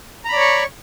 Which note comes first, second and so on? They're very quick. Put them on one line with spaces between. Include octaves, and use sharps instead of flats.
A#5 B5 D5 C#5 C#6